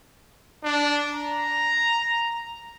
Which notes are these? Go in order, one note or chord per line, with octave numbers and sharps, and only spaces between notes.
D4
A#5